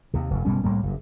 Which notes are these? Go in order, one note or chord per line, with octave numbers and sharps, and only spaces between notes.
D#2 C3
F1 F#2
F#1 B2 G3 C#4
C2 A2 G3 A#3
F#1 G2